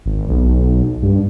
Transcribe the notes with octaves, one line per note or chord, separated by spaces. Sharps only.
G#1
B1
G2